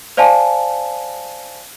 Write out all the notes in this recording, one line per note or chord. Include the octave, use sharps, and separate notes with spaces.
C5 D5 F5 G#5 A5